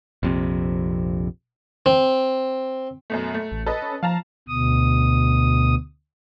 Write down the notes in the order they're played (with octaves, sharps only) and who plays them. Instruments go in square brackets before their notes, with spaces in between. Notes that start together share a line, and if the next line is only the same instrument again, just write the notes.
[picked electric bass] A#1 F2 C3
[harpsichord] C4
[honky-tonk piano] F#2 B2 A3
A3
[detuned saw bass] A1
[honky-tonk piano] A4 B4 D#5
[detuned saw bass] C#4
[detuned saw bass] F3 [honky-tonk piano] F5 A5 A#5
[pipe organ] D2 B2 D#6